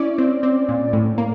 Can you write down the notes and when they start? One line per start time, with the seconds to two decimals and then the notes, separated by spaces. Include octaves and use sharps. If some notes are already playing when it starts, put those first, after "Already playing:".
Already playing: C#4 E4 D5
0.18 C4
0.43 C4
0.68 A#2
0.93 A2
1.18 A#3